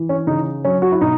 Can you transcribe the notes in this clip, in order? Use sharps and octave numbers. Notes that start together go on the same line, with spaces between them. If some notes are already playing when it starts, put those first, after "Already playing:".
Already playing: E3
C#4
C#3 D#4
F#3 C#4
F#4
E4
B2 D#4